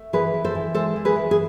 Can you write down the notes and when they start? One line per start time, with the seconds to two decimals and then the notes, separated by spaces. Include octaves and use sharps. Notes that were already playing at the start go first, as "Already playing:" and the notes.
Already playing: A3
0.13 E3 G#4 B4
0.34 E3
0.44 A4 C5
0.55 E3
0.74 G#3 A4 C5
0.96 E3
1.05 G#4 B4
1.16 E3
1.31 G#4